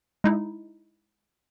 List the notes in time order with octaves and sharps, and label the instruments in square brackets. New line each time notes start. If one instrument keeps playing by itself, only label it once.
[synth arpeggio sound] G#3 D#4 E4